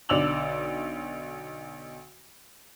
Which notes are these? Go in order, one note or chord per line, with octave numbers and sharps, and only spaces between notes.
B1 D3 D5 E6 F7 F#7